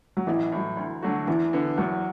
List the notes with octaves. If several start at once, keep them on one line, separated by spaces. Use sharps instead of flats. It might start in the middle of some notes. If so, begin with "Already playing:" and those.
F#3
A1 E3
A2 F#3
D2
D3 F#3 A3 F#4
E2 E3
D3 B3
E2 F#3